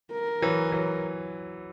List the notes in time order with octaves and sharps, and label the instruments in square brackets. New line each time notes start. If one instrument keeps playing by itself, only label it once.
[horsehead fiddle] A#4
[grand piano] E3 F#3
E3 F#3